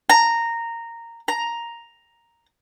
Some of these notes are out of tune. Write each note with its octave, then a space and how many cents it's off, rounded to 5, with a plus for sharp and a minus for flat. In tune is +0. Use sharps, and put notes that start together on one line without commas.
A#5 -10
A#5 +5